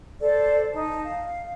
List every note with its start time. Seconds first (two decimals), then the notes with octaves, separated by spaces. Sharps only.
0.21 A4 C5 D5
0.73 D#4 A5
1.04 F5